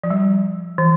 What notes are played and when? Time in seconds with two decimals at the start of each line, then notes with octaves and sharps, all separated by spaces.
0.04 F3
0.10 G3
0.78 E3